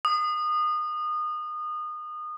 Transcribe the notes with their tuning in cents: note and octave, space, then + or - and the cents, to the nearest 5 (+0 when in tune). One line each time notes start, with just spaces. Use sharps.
D#6 -25